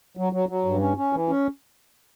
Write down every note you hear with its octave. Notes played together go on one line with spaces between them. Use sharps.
F#3
F#3
F#3
G2
C#4
C#4
E3
C#4